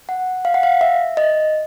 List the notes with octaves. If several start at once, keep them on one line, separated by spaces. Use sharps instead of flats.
F#5
F5
F#5
F5
E5
D#5